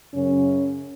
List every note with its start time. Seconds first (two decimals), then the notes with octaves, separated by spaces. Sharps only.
0.13 F#2 C#3 C#4